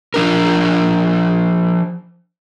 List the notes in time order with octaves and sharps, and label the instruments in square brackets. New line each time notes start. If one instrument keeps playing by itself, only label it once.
[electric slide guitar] F3 D4 A#4